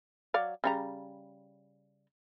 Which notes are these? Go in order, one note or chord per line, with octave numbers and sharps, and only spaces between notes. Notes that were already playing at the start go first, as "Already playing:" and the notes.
F#3 D5 F5
C#3 G3 A#5